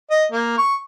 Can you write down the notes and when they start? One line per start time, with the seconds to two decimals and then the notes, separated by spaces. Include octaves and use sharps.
0.11 D#5
0.32 A#3
0.58 C#6